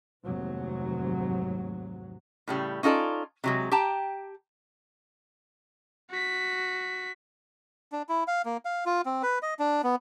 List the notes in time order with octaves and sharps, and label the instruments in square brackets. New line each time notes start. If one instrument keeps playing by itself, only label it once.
[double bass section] F1 D#2 G#2 F#3
[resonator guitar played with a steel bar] A2 C#3 G3
C#4 D#4 F4 A4 D5
C3 F#3 G#3
G4 G5 A5 A#5
[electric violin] F#4 B6
[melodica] D4
E4
F5
A#3
F5
F4
C4
B4
D#5
D4
B3